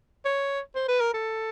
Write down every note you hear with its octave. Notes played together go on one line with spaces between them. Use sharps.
C#5
C5
B4
A#4
A4